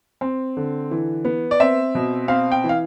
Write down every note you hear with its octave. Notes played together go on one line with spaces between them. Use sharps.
C4
D3
E3
B3
D5
C4 E5
B2
C4 F5
G5
E3
F5